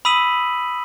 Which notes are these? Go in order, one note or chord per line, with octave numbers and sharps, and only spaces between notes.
B5 D#6 E6 B6 D#7 F#7